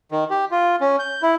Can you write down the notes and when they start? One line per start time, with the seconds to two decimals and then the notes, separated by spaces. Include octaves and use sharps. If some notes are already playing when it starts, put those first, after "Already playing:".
0.12 D#3
0.30 G4
0.51 F4
0.81 C#4
0.99 G6
1.22 E4